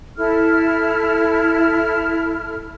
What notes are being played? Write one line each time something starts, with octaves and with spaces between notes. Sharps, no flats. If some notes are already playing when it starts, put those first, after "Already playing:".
E4 A4 F6